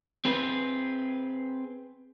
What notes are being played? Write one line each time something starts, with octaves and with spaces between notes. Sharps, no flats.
C4 G#4 B4